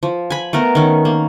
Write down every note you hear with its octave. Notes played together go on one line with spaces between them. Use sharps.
F3
G#5 B5
A3 B3 A#4
D#3 C#4
A#3